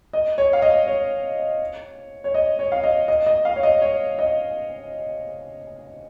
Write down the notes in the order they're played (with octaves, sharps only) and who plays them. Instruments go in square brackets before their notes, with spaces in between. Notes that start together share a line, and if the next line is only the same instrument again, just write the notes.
[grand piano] D#5
C#5
F5
D#5
C#5
C#5
D#5
C#5
F5
D#5
D#5
D#5
F5
C#5
D#5
C#5
D#5